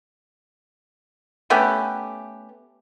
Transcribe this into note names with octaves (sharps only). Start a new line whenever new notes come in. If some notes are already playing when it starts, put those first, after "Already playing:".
A3 B3 C#4 G4